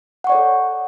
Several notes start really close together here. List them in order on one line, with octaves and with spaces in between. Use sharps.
F#5 C#6 D5 C#5 A4